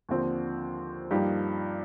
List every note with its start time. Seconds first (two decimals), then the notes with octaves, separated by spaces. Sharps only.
0.09 D#2 D3 F3 C4
1.11 G2 F3 A#3 D#4 G4